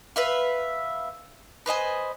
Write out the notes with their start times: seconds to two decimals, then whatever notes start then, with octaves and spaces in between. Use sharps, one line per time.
0.16 B4 E5 F5
1.66 B4 C5 D#5 G#5